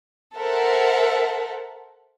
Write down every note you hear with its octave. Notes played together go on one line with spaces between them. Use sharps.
A4 A#4 C5 E5 F#5